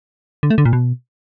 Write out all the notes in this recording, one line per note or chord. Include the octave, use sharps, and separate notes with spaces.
D3
A3
D3
A#2
B2